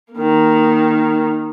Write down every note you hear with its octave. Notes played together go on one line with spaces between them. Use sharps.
D#3 A#3